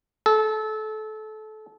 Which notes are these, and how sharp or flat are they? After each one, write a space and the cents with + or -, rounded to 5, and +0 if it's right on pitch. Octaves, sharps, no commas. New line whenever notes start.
A4 -25